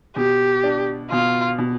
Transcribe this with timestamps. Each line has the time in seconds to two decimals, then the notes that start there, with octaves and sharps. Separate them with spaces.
0.16 B2 G4
0.63 D4
1.11 B2 F4
1.58 B2